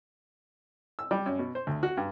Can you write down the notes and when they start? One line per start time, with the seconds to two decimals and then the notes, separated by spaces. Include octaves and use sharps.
0.99 E6
1.11 G3
1.26 F#2
1.39 B2
1.55 C5
1.67 D2
1.83 F#4
1.97 G2